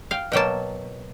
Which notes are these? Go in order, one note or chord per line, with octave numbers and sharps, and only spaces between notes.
F5 G5
B2 F#3 A#3 G5 A5